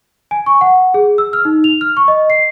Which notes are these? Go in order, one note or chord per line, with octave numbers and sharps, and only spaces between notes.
G#5
C#6
F#5
G#4
E6
F6
D#4
F7
F6
C#6
D#5
C7